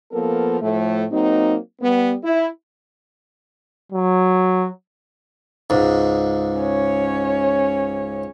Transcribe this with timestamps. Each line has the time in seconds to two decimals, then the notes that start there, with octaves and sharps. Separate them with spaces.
0.12 F3 A#3 B3 A4 A#4
0.61 A2 F3 A3
1.12 F#3 A#3 C4 D#4
1.82 G3 B3
2.24 E4
3.92 F#3
5.70 C#2 G#2
6.58 C#4 C#5